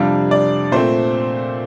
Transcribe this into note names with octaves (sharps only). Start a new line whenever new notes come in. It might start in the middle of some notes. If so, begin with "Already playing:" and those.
Already playing: F2 C3 G3 D4 F5
D5
A#2 A3 C4 C5